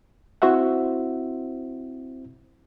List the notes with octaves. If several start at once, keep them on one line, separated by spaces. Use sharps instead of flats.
C4 E4 F#4 C5 E5 F#5